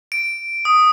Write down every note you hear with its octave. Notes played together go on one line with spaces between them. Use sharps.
D7
D#6